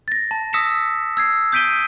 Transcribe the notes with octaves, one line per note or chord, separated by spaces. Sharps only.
A6 A#6
A5
D#6 E6 A#6 B6 C#7 E7
E6 G#6 C7
D#6 G6 B6 D7 D#7 G7